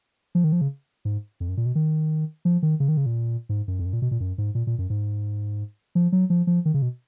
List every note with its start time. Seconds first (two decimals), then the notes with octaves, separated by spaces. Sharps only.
0.35 F3
0.44 D#3
0.52 F3
0.61 C#3
1.05 G#2
1.40 F2
1.49 F#2
1.57 A#2
1.66 B2
1.75 D#3
2.45 F3
2.63 D#3
2.80 C#3
2.88 D#3
2.97 C#3
3.06 A#2
3.49 G#2
3.68 F#2
3.79 F2
3.86 F#2
3.93 A#2
4.02 B2
4.11 A#2
4.20 F#2
4.38 G#2
4.55 A#2
4.67 A#2
4.78 F#2
4.90 G#2
5.95 F3
6.12 F#3
6.30 F3
6.47 F3
6.65 D#3
6.74 C#3
6.82 B2